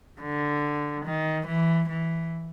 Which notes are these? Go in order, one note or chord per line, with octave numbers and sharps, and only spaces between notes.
D3
D#3
E3
E3